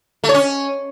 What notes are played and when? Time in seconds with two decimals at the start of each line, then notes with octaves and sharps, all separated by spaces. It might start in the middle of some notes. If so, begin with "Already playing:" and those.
0.24 A3
0.29 C#5
0.34 C#4